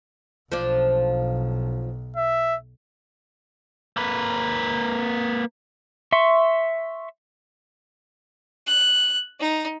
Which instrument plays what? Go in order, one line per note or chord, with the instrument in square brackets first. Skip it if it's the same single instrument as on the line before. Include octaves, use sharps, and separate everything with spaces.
[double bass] B1 [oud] F3 D4
[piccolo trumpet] E5
[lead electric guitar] A#3 B4
[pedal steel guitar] E5 C6 C#6
[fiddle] F#6
D#4